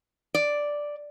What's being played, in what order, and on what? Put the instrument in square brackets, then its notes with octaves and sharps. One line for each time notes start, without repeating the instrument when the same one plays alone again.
[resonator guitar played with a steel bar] D5